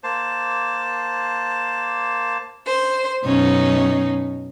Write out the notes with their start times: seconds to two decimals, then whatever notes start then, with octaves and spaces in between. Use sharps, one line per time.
0.03 A#3 C5 A5
2.68 C5
3.24 F#2 B2 C#4 D#4